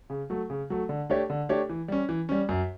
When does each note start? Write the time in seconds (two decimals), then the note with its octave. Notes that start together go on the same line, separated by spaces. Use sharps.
0.10 C#3
0.30 F#3 A3
0.50 C#3
0.70 F#3 A3
0.89 D3
1.10 A3 D4 G4 C#5
1.30 D3
1.49 A3 D4 G4 C#5
1.69 E3
1.88 G3 C#4
2.09 E3
2.29 G3 C#4
2.49 F#2